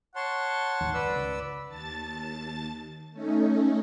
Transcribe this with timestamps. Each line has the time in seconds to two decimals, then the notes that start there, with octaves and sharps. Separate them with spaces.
0.16 C#5 F#5 A5 C6
0.81 G#1 D#2
0.94 G1 B4 D5 E6
1.16 C#2
1.68 D#2 A5 A6
3.12 A3 C#4 D#4